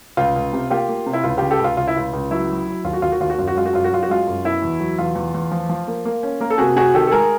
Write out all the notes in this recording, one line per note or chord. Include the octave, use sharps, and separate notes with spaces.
C#2 F4
C#2
C3
A#3 F4 G4
A#3
C3
E4
C#2 F4
C#3 F4 G4
G4 A4
C#2
F4
C#2 F4
E4
C#2 F4
C#2
F#3 E4
F#3
F#3
D#2 F4
F#4
D#2 F4
F#4
D#2 F4
F#4
F#2 F4
F#4
G#3 F4
F#4
F#2 F4
F#4
F#2 F4
F#4
G#3 F4
F#2
B2 E4
E2
F#3
E2 F4
E2
E2
F3
F3
A#3
A#3
C#4
A#3 A#4
A4
C3 F#4 G#4
C3 F#4 G#4
D#3 G4 A4
A4
G#3 G#4 A#4